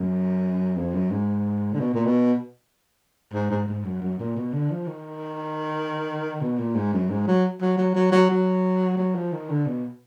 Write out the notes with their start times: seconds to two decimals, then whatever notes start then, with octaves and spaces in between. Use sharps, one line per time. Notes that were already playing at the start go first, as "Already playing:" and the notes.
Already playing: F#2
0.77 F2
0.94 F#2
1.11 G#2
1.73 D3
1.80 B2
1.94 A#2
2.06 B2
3.34 G#2
3.51 G#2
3.68 G#2
3.85 F#2
4.02 F#2
4.20 A#2
4.37 B2
4.53 D3
4.71 F3
4.87 D#3
6.41 B2
6.58 A#2
6.76 G#2
6.93 F#2
7.10 G#2
7.27 F#3
7.61 F#3
7.78 F#3
7.95 F#3
8.12 F#3
8.30 F#3
8.98 F#3
9.15 F3
9.33 D#3
9.50 D3
9.67 B2